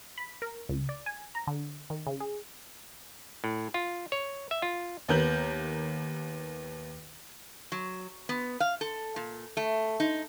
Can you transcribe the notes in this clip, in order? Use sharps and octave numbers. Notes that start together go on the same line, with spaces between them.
B5
A#4
C#2
D5
G#5
A#5
D3
D#3
C#3
G#4
A2
F4
C#5
E5
F4
D#2 B3 A#4 G6 F#7
F#3
B3
F5
A4
A#2
A3
D#4